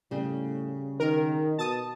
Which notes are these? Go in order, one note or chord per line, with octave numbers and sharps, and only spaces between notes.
A2 C#3 G3
D#3 A#4
B2 A5 D#6